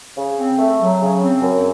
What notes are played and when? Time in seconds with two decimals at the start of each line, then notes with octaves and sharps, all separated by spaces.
0.16 C#3
0.37 C4
0.59 A3
0.80 F#3
1.01 C#3
1.22 C4
1.41 F#2